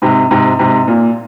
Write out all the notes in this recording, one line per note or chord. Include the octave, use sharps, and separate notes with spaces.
G#2 C3
G#2 C3
G#2 C3
A#2